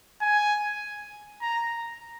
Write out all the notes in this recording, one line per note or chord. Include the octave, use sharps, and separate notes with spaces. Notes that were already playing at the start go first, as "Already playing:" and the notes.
G#5
A#5